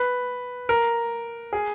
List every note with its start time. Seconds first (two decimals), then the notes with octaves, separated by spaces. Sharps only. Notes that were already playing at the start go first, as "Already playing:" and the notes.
Already playing: B4
0.69 A#4
1.53 G#4